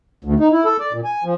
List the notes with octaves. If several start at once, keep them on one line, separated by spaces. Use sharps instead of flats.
D2
D#4
E4
A4
D5
A#2
G#5
F3